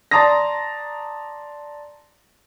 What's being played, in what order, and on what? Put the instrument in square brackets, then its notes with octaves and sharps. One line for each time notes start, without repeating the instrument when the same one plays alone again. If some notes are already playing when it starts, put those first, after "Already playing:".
[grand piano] D5 A5 A#5 C6 D#6 A#6